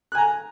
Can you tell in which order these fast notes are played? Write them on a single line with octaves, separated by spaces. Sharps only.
F#6 G#5 A#5